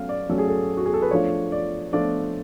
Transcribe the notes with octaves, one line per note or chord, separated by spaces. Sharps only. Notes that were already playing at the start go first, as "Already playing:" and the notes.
Already playing: F#3 A3 C#4 F5
D5
F#3 A3 C#4 A4
G#4
A4
F#4
G#4
A4
B4
F3 A3 D4 F4 C#5
D5
F3 A3 D4 F4 D5